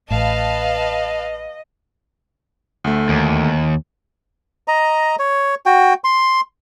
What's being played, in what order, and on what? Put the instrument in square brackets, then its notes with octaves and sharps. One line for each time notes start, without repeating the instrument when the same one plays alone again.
[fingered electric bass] A1 A2 [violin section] B4 F5 A5 [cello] D#5
[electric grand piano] D2 A3
[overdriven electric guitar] D#2
[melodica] D#5 A#5
C#5
F#4 G5
C6